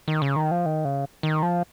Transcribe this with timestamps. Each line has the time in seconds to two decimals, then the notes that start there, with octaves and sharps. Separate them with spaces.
0.08 D#3
0.22 C#3
0.36 D#3
0.51 F3
0.66 D#3
0.85 C#3
1.23 D#3
1.42 F3